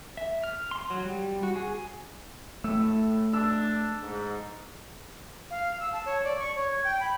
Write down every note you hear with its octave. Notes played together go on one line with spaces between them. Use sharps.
E5
F6
C6
F#3
G3
F#4
G#4
A2 A3 E6
D4 E6
G#2
F5
E6
A5
C#5
D5
C#6
C#5
G#6
G5
B5